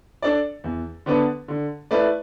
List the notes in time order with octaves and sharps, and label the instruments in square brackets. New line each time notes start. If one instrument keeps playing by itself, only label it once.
[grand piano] D4 A4 D5
E2
D3 B3 D4 B4
D3
A3 E4 B4 D5